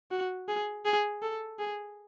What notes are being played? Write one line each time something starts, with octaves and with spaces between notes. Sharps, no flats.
F#4
G#4
G#4
A4
G#4